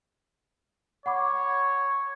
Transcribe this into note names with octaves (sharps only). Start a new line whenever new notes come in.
C#5 F#5 B5 D6